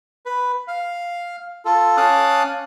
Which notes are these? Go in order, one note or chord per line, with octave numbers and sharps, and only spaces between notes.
B4
F5
F4 A4
C#4 F5 A5 D6 D#6 F#6